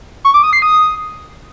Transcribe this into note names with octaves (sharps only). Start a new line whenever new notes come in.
C#6
D6
D#6
C7
D#6